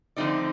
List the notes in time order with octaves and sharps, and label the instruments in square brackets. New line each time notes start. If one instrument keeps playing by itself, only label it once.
[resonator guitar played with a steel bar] D3 F3 A3 C4 D#4 D5